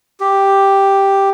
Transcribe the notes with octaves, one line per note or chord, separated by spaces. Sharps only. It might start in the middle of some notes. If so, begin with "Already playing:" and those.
G4